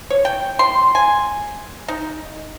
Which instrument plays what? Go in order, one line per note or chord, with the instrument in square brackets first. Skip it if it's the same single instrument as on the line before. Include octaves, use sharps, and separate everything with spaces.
[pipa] C#5
G5
C6
G#5
D#4